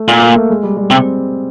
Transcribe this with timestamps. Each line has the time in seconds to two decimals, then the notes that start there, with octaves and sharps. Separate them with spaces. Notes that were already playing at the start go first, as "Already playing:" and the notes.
Already playing: A3
0.08 A#2 A#3
0.22 A#3
0.36 A3
0.50 G#3
0.63 G3
0.77 G3
0.90 C3 C4